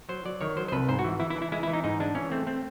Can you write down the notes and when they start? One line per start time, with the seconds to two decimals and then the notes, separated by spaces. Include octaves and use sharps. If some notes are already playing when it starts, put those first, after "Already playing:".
0.09 F#3 C5
0.25 F#3 D5
0.41 D#3 C#5
0.57 F#3 C5
0.68 C5
0.72 C2 B4
0.88 G#2 C5
0.99 F#4
1.04 E3
1.20 E3 E4
1.30 E4
1.36 E3
1.42 E4
1.52 G#3 E4
1.63 E4
1.68 E3
1.73 D#4
1.84 G#2 D#4
2.00 G#3 D4
2.15 E3 C#4
2.32 A3 C4
2.47 A3 C4